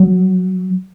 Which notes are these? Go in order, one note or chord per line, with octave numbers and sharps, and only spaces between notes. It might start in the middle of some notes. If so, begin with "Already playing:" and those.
Already playing: F#3